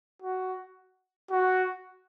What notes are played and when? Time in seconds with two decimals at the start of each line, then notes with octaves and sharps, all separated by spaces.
0.22 F#4
1.31 F#4